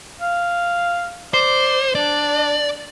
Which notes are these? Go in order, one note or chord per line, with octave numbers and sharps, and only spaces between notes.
F5
C5 D5
D4 D5